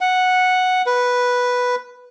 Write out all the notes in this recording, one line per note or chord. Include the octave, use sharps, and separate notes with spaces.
F#5
B4